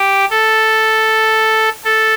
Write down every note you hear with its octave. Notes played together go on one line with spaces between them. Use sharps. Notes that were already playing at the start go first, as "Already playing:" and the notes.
Already playing: G4
A4
A4